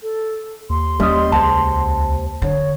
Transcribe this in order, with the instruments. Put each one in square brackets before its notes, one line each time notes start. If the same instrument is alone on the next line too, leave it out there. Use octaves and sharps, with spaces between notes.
[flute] A4
[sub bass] D#2 [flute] C6
[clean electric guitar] G3 C#4 D#5 [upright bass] A#3
[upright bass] C#2 [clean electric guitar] C5 F#5 A5
[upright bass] D3 [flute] C#5